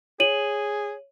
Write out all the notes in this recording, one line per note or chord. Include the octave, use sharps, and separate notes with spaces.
G#4 C#5 D#7 F#7